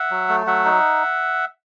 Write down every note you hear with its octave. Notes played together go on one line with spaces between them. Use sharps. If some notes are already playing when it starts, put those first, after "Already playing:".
Already playing: E5 F#5
F#3
A3
F#3 E5 F#5
D#4